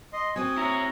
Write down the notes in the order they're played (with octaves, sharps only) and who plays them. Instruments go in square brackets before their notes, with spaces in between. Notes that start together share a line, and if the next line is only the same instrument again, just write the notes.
[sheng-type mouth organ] D#5 C6
[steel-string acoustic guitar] C4 F#4 [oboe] G#5 [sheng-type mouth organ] D#6
[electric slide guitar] E4 C#5 [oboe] A#5